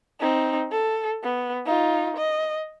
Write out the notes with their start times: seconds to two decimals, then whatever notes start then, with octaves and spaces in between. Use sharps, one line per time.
0.21 C4 D#4
0.72 A4
1.24 B3
1.66 D#4 F4
2.17 D#5